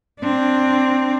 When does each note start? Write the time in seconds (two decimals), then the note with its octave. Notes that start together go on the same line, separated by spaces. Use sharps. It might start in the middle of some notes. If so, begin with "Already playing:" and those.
0.20 C4 D4